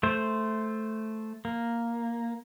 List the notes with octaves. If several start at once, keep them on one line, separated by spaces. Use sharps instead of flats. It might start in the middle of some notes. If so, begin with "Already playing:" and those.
A3 C5
A#3